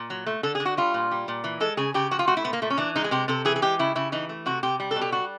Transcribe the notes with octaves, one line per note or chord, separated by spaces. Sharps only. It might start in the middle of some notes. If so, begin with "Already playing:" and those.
Already playing: A#2
F#3
A3
D3 A4
G#4
D3
F#4
G3 F4
A#2
G3
A#2
E3
G#3 A4
C#3 G#4
C#3 G4
F3 F#4
F4
A3 F#4
E4
A#2 B3
A#3
A#2 A3
C#4
E3 D4
G#3 D#4
G#4
C3 G4
C3 A4
E3 G#4
G#4
G#3 G4
C#3 E4
C#3 E4
E3 D#4
A3
C3 F#4
C3 G4
G3
A4
B2
G4
G3 F#4